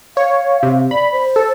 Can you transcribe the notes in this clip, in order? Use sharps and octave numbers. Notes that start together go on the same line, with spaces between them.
C#5 F5
C3
D5 B5
C5
A4